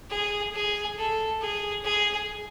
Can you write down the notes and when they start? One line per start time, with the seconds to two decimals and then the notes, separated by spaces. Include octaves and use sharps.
0.10 G#4
0.54 G#4
0.97 A4
1.41 G#4
1.84 G#4